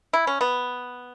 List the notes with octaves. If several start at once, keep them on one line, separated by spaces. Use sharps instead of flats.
E4
C#4
B3